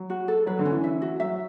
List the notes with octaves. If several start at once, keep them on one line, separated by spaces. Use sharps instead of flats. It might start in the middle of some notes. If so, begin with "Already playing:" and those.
Already playing: F#3
F#4
A4
F#3 B4
D3
C#4
E3
E5
F#4
F#3 E5